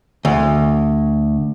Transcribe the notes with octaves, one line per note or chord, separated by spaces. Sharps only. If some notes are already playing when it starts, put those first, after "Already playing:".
D2